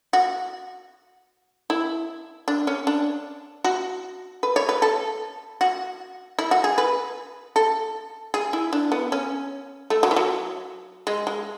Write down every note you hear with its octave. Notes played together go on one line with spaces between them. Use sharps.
F#4
E4
D4
C#4
D4
F#4
B4
C#5
B4
A4
F#4
E4
F#4
G#4
B4
A4
G#4
E4
D4
B3
C#4
A3
F#3
E3
F#3
G#3
G#3